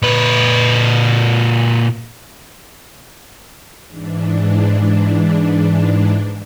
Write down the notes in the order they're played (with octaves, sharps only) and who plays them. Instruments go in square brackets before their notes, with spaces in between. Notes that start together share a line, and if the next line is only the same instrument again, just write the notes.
[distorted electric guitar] A#2 B4
[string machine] G#2 E3 D4